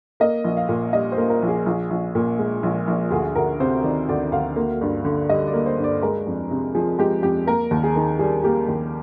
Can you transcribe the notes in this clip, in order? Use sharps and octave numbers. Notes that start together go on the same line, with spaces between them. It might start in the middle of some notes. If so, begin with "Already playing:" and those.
A#3 D#5
A#1
F5
A#2
G3 D#5
C5
A#3
A#4
A#1
G#4
A#1
A#1
A#2
G#3
A#1
A#1
D2 G#4
D2 A#4
C3 C5
D#3 D5
D2 D5
D2 F5
A#3
G2
D3
G3 D#5
D5
A#3
C5
G2
D5
G#3 A#4
F2
C3
F3 G#4
G#3 G4
F2 G4
A#3 A#4
D#2
G#4
D#3
G3 G#4
A#3 G4
D#2